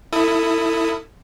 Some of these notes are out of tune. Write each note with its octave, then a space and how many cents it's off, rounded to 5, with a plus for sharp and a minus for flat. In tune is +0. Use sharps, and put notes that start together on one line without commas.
E4 +5 A4 +35 D#6 +0